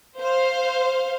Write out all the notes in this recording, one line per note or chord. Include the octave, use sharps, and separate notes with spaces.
C5 F5